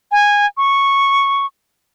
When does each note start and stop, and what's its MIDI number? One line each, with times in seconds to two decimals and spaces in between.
0.12 0.46 80
0.57 1.46 85